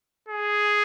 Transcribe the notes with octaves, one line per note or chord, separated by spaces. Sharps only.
G#4